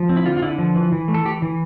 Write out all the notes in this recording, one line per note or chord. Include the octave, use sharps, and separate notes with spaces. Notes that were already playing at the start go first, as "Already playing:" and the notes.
Already playing: F3
C4
E4
D3 F4
F4
D3 E4
F3
E3
E3
A3
A4
E3 G4
E3